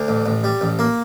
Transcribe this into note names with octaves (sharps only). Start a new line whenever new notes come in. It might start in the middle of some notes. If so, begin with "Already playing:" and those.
Already playing: D2
A1
A1
G3
A1
A#3